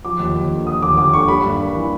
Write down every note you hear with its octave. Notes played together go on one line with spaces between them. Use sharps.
F3 D6
D#2
D#2
D3
F3 D#6
D#2 D6
D#2 D6
D3 C#6
G3 B5
G2
A#3
E3